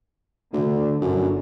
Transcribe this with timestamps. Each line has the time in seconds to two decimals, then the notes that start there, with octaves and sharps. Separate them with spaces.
0.53 D2 D3
1.02 G1 F#2 D3